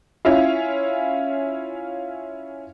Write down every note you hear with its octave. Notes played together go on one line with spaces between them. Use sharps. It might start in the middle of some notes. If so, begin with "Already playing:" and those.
C#4 E4 F4